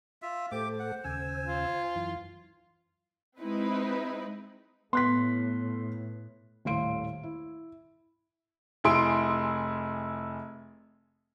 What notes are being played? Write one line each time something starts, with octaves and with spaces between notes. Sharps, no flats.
F4 E5
A2 A3 G4 A4 C5 D6
F#5
D#2 C#3 G#5 E6
F4
F#2 E3
G#3 C4 D#4 E4 B4
A2 B3 C6 F#6 B6
D#1 A2 E4 F5 C6 D7
E4
F1 E4 G#4 C6 D7